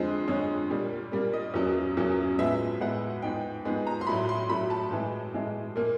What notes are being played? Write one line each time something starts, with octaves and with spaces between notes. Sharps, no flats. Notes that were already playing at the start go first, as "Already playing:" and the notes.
Already playing: F2 D3 F3 G#3 C5
F2 D3 F3 G#3 C#5
A#2 G3 A#3
A#2 G3 A#3 D5
D#5
E2 C#3 F#3 A#3
E2 C#3 F#3 A#3
A2 F3 G#3 B3 E5
A2 F3 G#3 B3 F#5
G#2 F3 G#3 B3 G5
G#2 F3 G#3 B3
A#5
C6
A2 F#3 A3 B5
C6
A2 F#3 A3 B5
A5
A2 E3 G#3
A2 E3 G#3
A#2 F3 A#3